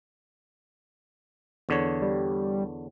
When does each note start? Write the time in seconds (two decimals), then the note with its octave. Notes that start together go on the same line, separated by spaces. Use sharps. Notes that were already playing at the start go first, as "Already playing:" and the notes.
1.69 E2 D3 C#5
2.02 G3